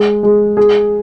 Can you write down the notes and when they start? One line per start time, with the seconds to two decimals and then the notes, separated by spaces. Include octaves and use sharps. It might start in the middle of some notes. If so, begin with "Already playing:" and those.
Already playing: G#3
0.23 G#3
0.57 G#4